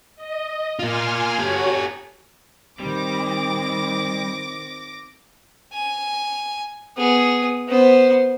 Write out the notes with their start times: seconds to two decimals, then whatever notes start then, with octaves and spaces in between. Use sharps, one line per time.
0.16 D#5
0.79 A#3 F4 G#5 C6 F6
1.39 F#4 G4 A4 C#5
2.80 D#3 G3 C4 D6 A#6
5.73 G#5
6.97 B3 G#4
7.69 B3 C5